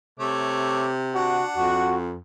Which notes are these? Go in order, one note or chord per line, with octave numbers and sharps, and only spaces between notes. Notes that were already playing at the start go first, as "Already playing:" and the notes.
C3 A3 C#5 D6
D4 F#4 F#5
F2 F#4